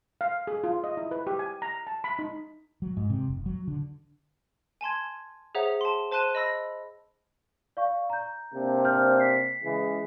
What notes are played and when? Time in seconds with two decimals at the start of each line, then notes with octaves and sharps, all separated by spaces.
0.21 F5
0.47 G#4
0.64 F4
0.84 D#5
0.97 E4
1.11 B4
1.27 G4
1.39 G#5
1.62 A#5
1.87 A5
2.04 B5
2.19 D#4
2.82 F#3
2.97 G#2
3.10 C3
3.28 F1
3.46 F#3
3.67 D3
4.81 G#5 A5 C6 G#6
5.55 G#4 C5 C#5 E5 F#5 A#5
5.81 A5 C6
6.12 C5 A5 C6 F#6 D#7 E7
6.35 D#5 B5 E6 A#6
7.77 D5 F5 C#6
8.10 A#5 G6
8.54 C3 A#3 D4
8.85 C5 F6 G6
9.20 B6 C7
9.63 C#3 E3 G#3